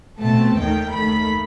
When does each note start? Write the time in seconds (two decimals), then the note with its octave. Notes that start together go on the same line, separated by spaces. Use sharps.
0.20 B2 A3 C4 A5
0.57 D#2 D#3 A3 G5
0.93 D#2 D#3 A3 B5